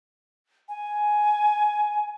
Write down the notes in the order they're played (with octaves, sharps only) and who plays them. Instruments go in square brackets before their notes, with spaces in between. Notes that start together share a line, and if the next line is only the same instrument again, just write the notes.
[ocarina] G#5